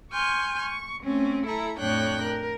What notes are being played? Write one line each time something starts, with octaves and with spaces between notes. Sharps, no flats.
G#5 C6 C#6 F6 G6
C#6
A3 C4 C#4
E4 A4 A#5
F2 A2 D4 C#5 G5 F#6
A#4